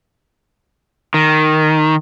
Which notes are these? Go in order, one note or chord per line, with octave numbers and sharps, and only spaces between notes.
D#3